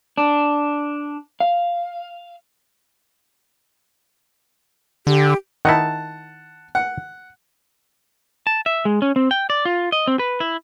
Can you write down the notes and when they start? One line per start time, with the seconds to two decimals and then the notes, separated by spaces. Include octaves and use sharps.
0.18 D4
1.40 F5
5.07 D3 G4
5.65 D#3 D#4 E4 F#5 A5
6.75 F#5
8.47 A5
8.66 E5
8.85 G#3
9.02 C#4
9.16 C4
9.31 G5
9.50 D5
9.65 F4
9.92 D#5
10.07 C4
10.19 B4
10.40 E4